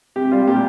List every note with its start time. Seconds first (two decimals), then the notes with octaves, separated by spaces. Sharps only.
0.16 C3 G4
0.31 G3 F4
0.47 A#2 G4